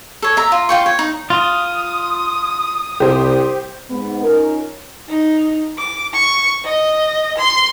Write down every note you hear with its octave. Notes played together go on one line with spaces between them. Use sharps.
A4 C#5
E5 A#5
F4
F4 G5 C#6
C#5
D#4
F4 D#6
C2 G4 C5
G#2 B3
C#4 D#4 F4 A#4
D#4
D6
C#6
D#5
C6